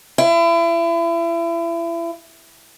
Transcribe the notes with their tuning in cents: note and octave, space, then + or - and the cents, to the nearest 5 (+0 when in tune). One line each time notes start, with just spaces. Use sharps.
E4 +35